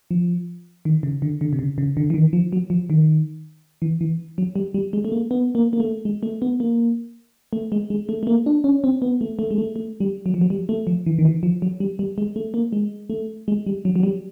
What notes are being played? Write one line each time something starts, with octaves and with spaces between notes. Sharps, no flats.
F3
D#3
C#3
D3
D3
C3
C#3
C#3
D3
E3
D#3
F3
F#3
F3
D#3
E3
E3
F#3
G3
G3
G#3
A3
A#3
B3
A#3
A#3
A3
G#3
A3
B3
A#3
A3
G#3
G#3
A3
A3
A#3
D4
C#4
C4
B3
A3
A3
G#3
A3
A3
G3
F#3
F3
F#3
G3
A3
F3
E3
D#3
E3
F3
F#3
G3
G3
G#3
A3
A#3
G#3
A3
G#3
G3
F#3
F#3
G3